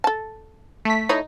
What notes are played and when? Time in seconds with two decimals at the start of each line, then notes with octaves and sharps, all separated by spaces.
0.04 A4 A5
0.85 A3 B6
1.09 A3 D#4 E4 C#5